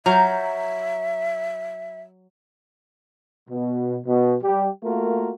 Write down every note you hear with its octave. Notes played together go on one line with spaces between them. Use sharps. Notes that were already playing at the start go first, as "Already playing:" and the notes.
F#3 E5 A#5 F6 G6
B2
B2
G3 G4
A3 A#3 F4 F#4 A#4